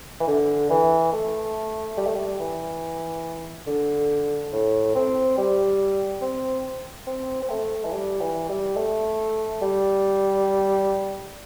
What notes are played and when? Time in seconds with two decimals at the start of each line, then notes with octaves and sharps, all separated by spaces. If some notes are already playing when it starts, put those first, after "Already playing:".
0.21 E3
0.27 D3
0.70 E3
1.13 A3
1.97 G3
2.06 A3
2.15 G3
2.40 E3
3.67 D3
4.53 A2
4.95 C4
5.38 G3
6.22 C4
7.07 C4
7.42 C4
7.50 A3
7.85 E3
7.92 G3
8.21 E3
8.49 G3
8.77 A3
9.62 G3